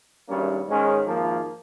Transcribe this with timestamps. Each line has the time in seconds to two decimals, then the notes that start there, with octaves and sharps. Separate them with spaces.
0.28 G#1 G2 G3 A#3 C#4
0.67 G#2 D#3 G#3 C#4
1.07 G#1 G#2 F3 A#3